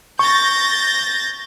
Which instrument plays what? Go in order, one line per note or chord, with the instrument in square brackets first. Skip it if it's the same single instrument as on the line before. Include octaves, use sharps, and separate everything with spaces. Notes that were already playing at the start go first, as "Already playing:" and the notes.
[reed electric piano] C#6 [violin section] G6 A6 A#6